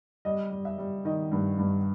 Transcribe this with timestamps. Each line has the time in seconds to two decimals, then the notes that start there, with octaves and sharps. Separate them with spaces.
0.25 G3 D#5
0.51 G3
0.65 E5
0.78 G3
1.05 D#3 D#5
1.32 G2
1.58 G2